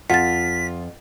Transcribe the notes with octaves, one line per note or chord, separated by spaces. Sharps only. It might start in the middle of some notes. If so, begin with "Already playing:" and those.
F2 F4 F#5 A6 B6